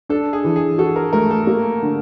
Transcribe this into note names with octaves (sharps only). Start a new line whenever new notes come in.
D4 A4
G#4
E3
G#4
F#4 A4
A#4
A3 A#4
A4
A#3
D3